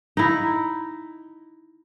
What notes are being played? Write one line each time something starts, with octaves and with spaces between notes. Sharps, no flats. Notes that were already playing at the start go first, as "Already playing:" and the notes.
D#4 E4